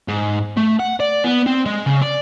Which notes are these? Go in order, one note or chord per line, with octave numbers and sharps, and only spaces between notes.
G#2
A3
F#5
D5
B3
C4
G#3
C#3
D5